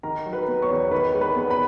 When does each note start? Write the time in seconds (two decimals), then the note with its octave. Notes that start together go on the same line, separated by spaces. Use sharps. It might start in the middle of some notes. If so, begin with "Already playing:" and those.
0.03 D#3 A#4 A#5
0.26 F#3
0.33 B4 B5
0.48 B3
0.62 C#5 C#6
0.69 E2
0.91 D#3 B4 B5
1.14 G#3
1.21 B4 B5
1.36 B3
1.50 B4 B5